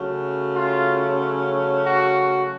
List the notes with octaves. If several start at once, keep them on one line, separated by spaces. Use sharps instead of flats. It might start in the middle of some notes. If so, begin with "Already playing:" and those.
Already playing: C#3 F#3 A3 C#4
F4
F#4